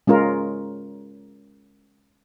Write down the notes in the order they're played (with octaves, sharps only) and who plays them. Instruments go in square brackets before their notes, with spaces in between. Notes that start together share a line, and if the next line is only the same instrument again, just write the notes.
[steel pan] G#3 C#4 F4 A#4